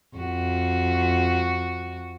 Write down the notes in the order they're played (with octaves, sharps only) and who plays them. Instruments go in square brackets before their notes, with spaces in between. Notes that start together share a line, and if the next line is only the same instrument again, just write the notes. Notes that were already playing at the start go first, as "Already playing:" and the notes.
[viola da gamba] F2 F#4